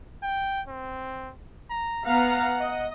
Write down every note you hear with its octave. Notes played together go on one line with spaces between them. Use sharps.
G5
C4
A#5
B3 F5 F#5 A#5
D#5